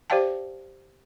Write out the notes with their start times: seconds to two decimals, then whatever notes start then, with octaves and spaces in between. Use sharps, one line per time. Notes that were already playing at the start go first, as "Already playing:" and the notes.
0.10 G4 C5 D5 F5 G5 A5